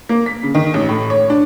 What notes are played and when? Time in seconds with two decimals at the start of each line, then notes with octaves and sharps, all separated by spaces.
0.09 A#3
0.26 B6
0.43 C#3
0.54 D#3
0.74 A1
0.89 A2
1.10 C#5
1.30 D4